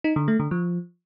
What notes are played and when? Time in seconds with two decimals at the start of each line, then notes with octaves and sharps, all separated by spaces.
0.04 D#4
0.16 D3
0.28 A3
0.40 D3
0.51 F3